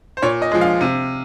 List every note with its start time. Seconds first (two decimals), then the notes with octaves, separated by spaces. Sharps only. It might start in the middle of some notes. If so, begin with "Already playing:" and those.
0.17 C5
0.22 A#2 C#5
0.42 D#5
0.52 F3 G#3
0.61 F5
0.81 C3